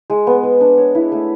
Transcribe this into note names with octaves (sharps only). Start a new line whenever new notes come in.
G#3
B3
G#3
D4
C#5
E4
A3